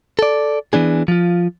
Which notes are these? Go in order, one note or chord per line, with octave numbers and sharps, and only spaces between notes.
A4 D5
E3 B3 D4 G#4
F3 F4